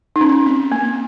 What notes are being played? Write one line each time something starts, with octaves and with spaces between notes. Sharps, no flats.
D#4
C#4
C4
A#3